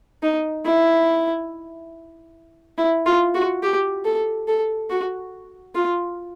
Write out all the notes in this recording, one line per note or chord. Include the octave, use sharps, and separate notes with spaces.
D#4
E4
E4
F4
F#4
G4
A4
A4
F#4
F4